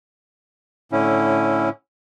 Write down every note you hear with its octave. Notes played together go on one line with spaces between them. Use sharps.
A2 D3 C#4 E4